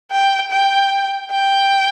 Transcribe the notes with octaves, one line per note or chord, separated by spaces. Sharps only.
G5
G5
G5